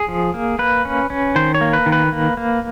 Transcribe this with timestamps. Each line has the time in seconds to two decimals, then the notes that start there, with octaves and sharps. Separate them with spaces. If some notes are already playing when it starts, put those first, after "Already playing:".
Already playing: G#4
0.09 F3
0.34 A#3
0.59 A#3 B4
0.85 C#4
1.10 C#4
1.36 D#3 C5
1.55 C#5
1.61 A#3
1.73 B4
1.86 D#3
1.92 B4
2.12 A#3
2.37 A#3